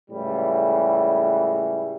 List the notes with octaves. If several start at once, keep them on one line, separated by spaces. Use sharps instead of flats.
C#2 A2 E3 G3